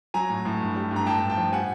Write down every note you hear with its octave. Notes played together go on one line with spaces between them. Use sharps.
F#3 G#5 A#5
A2
A2
G2
G3
G2
A#5
A2 G5 A5
A2
G5 A5
F3
G3 F#5 G#5